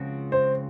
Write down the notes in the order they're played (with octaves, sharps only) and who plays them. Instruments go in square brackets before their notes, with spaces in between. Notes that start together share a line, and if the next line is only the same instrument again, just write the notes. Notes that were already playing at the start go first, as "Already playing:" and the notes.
Already playing: [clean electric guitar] C#2 C#3 F3 C4 F#4
[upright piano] C5